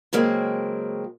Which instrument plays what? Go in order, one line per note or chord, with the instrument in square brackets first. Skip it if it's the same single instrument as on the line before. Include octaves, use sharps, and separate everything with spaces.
[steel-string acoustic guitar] C#3 F#3 G#3 A#3 C4